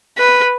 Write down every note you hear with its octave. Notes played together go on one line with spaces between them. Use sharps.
B4